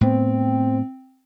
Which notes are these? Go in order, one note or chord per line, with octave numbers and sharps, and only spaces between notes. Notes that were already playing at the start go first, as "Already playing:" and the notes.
A2 B3 C4